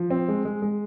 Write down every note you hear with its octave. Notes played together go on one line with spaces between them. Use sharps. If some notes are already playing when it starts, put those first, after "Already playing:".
Already playing: F3
C4
G#3
G#3
G#3